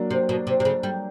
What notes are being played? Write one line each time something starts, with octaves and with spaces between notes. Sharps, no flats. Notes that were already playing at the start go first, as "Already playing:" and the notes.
Already playing: F#3 A#3 D4
C3
B2
C3
C3
C#3
G3